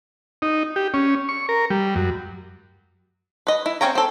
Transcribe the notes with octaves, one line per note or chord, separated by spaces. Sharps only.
D#4
G4
C#4
C#6
A#4
G3
F#2
B4 D#5
E4
C4 C#4 C#5 G5 A#5
C4 A4